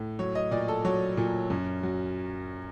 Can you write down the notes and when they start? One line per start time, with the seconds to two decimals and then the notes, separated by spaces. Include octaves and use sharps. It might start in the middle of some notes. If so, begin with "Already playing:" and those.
Already playing: A2
0.19 F#3 C#5
0.35 D#5
0.51 A#2 D5
0.68 A4
0.85 F#3 C#5
1.17 A#2
1.50 F#2
1.83 F#3